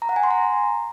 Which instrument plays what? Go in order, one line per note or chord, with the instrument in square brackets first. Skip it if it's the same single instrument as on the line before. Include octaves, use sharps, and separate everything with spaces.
[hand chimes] A#5
F#5
G#5
C6
A#5